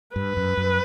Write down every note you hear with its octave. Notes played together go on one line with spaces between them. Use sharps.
G2 B4
F#2
F#2